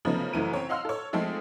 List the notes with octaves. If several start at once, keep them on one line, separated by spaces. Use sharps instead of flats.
C#3 F3 F#3 A3 B3 D#4
F#1 F#2 E3 A3 D#7
C4 C#5
D#5 F5 F#5 C6 E6 F6
A4 C#5
F3 G#3 A3 C4 A4